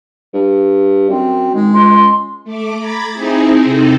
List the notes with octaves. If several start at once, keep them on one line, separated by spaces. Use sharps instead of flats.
G2
F#2 C4
D#3 G#3
C#2 C6
A3 D6
A#5 B5 D6 G#6 A6
C4 D#4 E4 G#4
C3 C4 D#4 A4